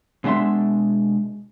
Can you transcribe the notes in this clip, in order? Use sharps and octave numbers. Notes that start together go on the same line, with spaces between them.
B2 G#3 D4 E5 C6